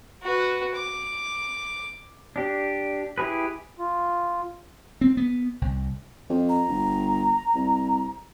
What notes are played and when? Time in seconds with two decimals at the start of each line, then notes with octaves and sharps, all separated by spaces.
0.23 F#4 B4
0.74 D6
2.36 D4 G4
3.18 E4 G4 G#4 B4
3.79 F4
5.01 C4
5.17 B3
5.62 C2
6.30 F2
6.49 A#5
6.69 G1
7.55 C2